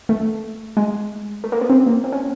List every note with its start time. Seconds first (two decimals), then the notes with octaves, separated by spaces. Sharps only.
0.09 A3
0.77 G#3
1.44 A3
1.52 A#3
1.61 B3
1.70 C4
1.87 A#3
2.04 C4
2.12 C#4